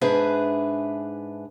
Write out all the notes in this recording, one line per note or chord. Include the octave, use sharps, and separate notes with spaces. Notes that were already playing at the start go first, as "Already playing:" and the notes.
G#2 D4 G#4 B4 E5